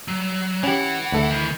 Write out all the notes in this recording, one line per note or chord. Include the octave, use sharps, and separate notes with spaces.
F#3
E3 C#4 G4 F#5
D2 A4 E5
D#3